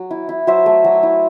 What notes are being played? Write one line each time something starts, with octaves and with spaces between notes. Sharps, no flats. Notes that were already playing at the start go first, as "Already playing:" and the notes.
Already playing: F#3
E4
E4
F#3 C5 E5
A3
F#3
E4